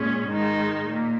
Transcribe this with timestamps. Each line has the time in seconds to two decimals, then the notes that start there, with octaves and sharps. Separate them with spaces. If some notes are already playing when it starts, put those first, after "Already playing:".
Already playing: A#2 G#3 C#4
0.28 G#2 D#3 G#3 D#4
0.87 A#2 A#3